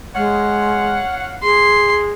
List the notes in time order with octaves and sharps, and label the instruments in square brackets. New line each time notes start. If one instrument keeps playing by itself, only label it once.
[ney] G#3 [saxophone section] C#5 F5 F#5
[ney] G#4 [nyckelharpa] C6